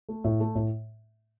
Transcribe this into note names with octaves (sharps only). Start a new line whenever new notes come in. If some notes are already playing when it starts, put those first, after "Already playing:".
A3
A2
A3
A2